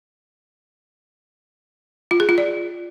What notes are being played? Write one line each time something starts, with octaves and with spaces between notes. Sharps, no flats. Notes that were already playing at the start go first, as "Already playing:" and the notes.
F4
G#4
F4
D5